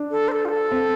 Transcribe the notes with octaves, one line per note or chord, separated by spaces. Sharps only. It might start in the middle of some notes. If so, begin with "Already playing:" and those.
Already playing: D4
A4
C5
A4
F4
A4
C4